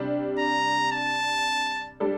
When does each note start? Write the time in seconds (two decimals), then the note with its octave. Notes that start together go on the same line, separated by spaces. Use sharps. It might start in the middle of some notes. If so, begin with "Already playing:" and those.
Already playing: C3 G3 D4 G4
0.39 A#5
0.92 A5
2.00 G3 D4 A4 D5